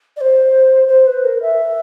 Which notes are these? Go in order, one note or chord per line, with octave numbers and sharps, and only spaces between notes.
D5
C5
C5
B4
A#4
E5